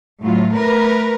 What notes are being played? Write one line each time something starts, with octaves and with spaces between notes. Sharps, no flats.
A2 F#3 F4
A3 A#4 B4